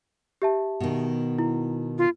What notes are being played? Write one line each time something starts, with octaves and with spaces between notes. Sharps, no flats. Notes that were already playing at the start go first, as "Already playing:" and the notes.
G4 E5 A5
B2 D#3
E4
F4